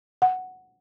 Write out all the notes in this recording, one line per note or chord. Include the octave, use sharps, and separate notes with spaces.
F#5